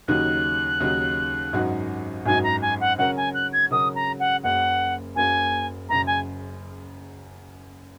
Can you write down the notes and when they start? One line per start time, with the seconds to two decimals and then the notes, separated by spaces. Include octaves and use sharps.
0.08 D#2 C#3 F#3 D#4 F#6
0.80 D#2 C#3 F#3 D#4
1.53 G#1 F#2 F#3 D#4 F#4
2.26 G#1 F#2 F#3 D#4 F#4 G#5
2.44 A#5
2.62 G#5
2.80 F#5
2.98 C#3 F#3 C#4 F#4 A#4 F#5
3.17 G#5
3.34 F#6
3.53 G#6
3.71 C#3 F#3 C#4 F#4 A#4 D#6
3.95 A#5
4.20 F#5
4.43 F#1 F#2 F#3 A#3 C#4 F#5
5.16 F#1 F#2 F#3 A#3 C#4 G#5
5.89 F#1 F#2 C#3 A#5
6.07 G#5